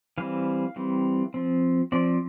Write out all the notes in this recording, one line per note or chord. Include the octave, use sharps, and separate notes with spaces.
E3 G3 C4 F5
E3 G3 C4
F3 C4
F3 C4 D5